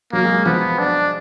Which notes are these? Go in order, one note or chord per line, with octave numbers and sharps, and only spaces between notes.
F#3 A#3
G#3
F3 B3
D4